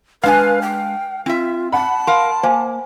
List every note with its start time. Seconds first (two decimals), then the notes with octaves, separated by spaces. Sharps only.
0.23 G#3 D4 B4 F5 G#5
0.62 G5
1.26 C4 F4 E5
1.72 F#5 A5 B5
2.07 A#4 F5 C6
2.43 A#3 C5 F5 G#5